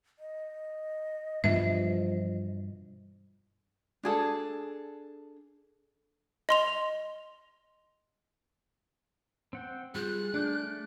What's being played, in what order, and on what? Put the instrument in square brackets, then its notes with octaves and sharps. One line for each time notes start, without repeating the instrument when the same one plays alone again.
[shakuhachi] D#5
[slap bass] G2 B2 E3 [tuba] F3 [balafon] E5
[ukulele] D4 G#4 A4
[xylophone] D#5 C6 F7
[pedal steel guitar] C4 F#5 G5
[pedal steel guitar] G3 F4 G6 [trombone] G#4 [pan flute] F#6
[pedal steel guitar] A3 D5 G6 [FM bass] D4